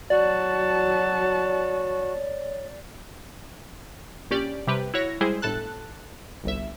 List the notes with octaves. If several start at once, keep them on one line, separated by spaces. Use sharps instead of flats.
F#3 F#4 C#5 D5 A5
A#1 C#4 G4 D5
C3 G3 G4 B4
E4 F#4 C#5 A#6
G3 G#3 E4 G#4 C5
G1 A2 A4 A5 F#6
G1 C2 E5